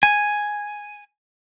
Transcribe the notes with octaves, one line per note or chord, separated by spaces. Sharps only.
G#5